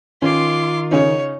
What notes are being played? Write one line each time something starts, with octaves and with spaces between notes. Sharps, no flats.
D#3 C#4 F4 C6 D6
C#3 C#4 D#4 C#5